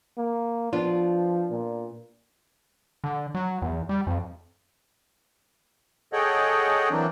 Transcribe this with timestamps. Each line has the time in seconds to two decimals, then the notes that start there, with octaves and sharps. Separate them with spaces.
0.18 A#3
0.73 F3 B3 D4 F4
1.51 A#2
3.04 D3
3.35 F#3
3.62 E2
3.89 G3
4.07 F2
6.13 G#4 A4 C#5 D#5 F#5 G5
6.91 E3 F#3 A#3 C4 D4